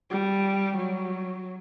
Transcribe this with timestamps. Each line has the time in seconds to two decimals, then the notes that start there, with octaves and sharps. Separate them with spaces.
0.10 G3
0.77 F#3